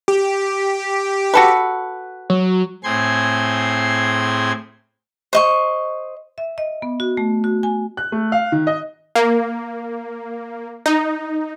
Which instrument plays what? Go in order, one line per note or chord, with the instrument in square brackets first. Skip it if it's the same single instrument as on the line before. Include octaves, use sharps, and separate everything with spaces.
[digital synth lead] G4
[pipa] F#4 A4 B4
[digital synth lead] F#3
[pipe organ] A2 C4 G#4 C6 G#6
[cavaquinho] C5 D#5 C#6
[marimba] E5
D#5
B3
F#4
A3
F#4
G#5
[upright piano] F#6
A3
F5
D#3
D#5
[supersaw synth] A#3
D#4